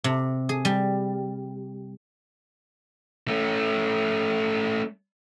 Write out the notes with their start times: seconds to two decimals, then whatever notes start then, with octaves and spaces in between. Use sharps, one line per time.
0.04 C3
0.49 G#4
0.65 G3
3.28 A3 C#4